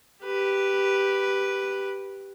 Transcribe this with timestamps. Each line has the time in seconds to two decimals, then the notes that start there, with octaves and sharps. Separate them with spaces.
0.25 G4 B4